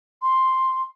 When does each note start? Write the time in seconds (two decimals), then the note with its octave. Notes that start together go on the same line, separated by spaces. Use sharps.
0.22 C6